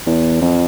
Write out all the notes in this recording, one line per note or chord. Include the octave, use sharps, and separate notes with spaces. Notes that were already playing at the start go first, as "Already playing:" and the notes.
E2
F2